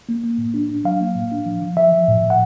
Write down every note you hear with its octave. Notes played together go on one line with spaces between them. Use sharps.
A#3
A#3
A2
D4
D4
F#3 F5
A#3
A2
D4
F3
F3
F3 E5
F3
A2
F3
F#5